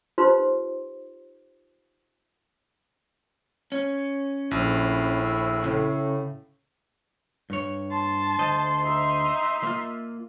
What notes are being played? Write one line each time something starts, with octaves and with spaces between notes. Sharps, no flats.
D#4 F4 G4 B4 C5 C6
C#4
A#1 A2 F3 E4
A2 C#3
G2 C#5
A5 C6
D2 C5 D#5
D#4 E5
A#3 F4